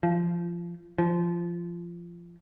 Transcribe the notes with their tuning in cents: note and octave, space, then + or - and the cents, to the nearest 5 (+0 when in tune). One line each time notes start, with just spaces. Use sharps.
F3 -20
F3 -20